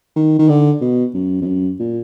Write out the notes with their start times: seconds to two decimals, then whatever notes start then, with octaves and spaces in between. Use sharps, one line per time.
0.16 D#3
0.39 D#3
0.49 D3
0.81 B2
1.14 F#2
1.41 F2
1.46 F#2
1.80 A#2